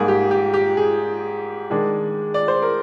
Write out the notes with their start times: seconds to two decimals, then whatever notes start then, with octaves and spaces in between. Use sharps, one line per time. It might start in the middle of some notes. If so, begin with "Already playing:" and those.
Already playing: G#2 G3 A#3 G#4
0.08 G4
0.31 G4
0.54 G4
0.77 G#4
1.70 D#3 G#3 D4
2.34 D5
2.48 C5
2.62 A#4